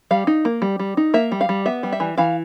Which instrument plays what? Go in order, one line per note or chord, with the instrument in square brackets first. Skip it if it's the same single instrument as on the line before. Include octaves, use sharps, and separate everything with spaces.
[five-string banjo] G3 F5
D#4
A#3
G3
G3
D#4
A#3 E5
G3
F5
G3
B3 E5
G3
E5
E3
E3 F5